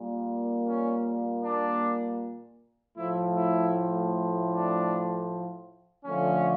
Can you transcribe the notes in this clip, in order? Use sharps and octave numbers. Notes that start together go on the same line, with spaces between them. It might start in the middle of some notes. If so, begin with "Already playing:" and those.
Already playing: A#2 G3 A#3
C#4
D4
A2 F3 A3 E4
E4
D4
D3 F3 A3 C#4